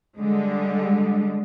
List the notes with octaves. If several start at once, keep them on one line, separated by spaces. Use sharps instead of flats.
D3 G3 G#3